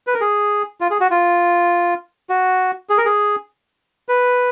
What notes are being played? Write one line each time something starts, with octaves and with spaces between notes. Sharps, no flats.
B4
A#4
G#4
F4
G#4
F#4
F4
F#4
G#4
A#4
G#4
B4